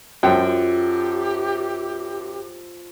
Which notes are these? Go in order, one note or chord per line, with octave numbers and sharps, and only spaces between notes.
F#2 F4 G4 A4 C5 G5